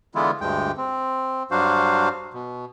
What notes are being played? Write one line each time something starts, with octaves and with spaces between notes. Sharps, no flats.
D3 E3 G#3 B3 E4 F4
D2 G2 G#3 G5
C4
G2 F#3 D4 F#4 C5 F5
B2